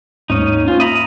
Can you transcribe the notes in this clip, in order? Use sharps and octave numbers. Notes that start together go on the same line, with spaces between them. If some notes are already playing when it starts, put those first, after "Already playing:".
D#2 G#2 G#3 C#4 D#4
A#3 C#4 F4 C5
E5 A#5 B5 D#6